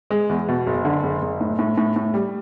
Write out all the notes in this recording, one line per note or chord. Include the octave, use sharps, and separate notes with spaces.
G#3
E2
B2
F#1
D3
F#1
F#1
A2
A2
A2
A2
G3